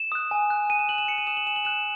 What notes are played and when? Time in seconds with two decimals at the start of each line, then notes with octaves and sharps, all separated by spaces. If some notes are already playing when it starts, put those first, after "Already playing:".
Already playing: E7
0.12 D#6 F#6
0.31 G#5
0.50 D#6 F#6
0.70 G#5 D#7
0.79 E7
0.88 D#6 F#6 F#7
0.98 E7
1.08 G#5 C#7
1.18 D#7
1.27 D#6 F#6 E7
1.37 F#7
1.47 G#5 E7
1.56 F#7
1.65 D#6 F#6 E7